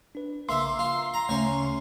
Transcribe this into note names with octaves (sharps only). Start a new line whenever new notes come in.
D4 B4
A#1 C#3 A#3 E5 C6
F4 E6
A#5
D2 C#3 A3 C#4 C#5 E5